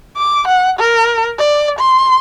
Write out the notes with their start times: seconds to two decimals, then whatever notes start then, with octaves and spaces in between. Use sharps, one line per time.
0.18 D6
0.48 F#5
0.79 A#4
1.39 D5
1.79 C6